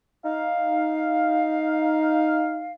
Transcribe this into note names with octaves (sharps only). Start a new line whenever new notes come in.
D#4 F5